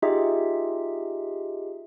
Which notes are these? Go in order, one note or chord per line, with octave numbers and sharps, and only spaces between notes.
D#4 F4 G4 G#4 D#5 E5